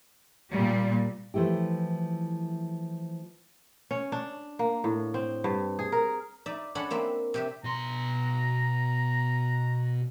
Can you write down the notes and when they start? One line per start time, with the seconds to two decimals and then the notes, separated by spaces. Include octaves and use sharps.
0.51 A#2 G3
1.34 E3 F3 A3 E4 G4
3.91 C#4
4.12 D4
4.59 A#3
4.84 A2
5.14 C4
5.44 G2
5.79 G#4
5.92 A#4
6.46 D#4 D5 E5
6.75 C#4 D4 A4 F#5 B5
6.91 A#3 C4 E5
7.34 C3 G4 E5
7.64 B2 A#5 C6